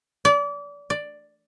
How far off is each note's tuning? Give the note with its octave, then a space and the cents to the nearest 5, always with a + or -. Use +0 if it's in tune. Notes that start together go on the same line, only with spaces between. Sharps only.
D5 -30
D5 +5